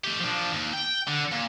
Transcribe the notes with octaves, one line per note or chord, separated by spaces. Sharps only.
A3 G4
F3 D4
D#2
G5
D3
A#2